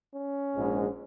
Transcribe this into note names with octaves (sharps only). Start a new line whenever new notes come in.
C#4
A#1 G#2 G#3